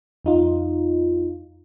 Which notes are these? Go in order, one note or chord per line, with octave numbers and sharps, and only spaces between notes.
F2 D#4 F4